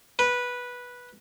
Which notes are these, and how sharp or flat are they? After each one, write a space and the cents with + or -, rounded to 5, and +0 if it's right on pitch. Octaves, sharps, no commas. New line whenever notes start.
B4 -10